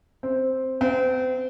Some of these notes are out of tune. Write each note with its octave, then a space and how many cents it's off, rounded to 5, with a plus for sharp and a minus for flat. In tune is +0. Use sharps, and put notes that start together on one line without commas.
C4 +0
C4 -35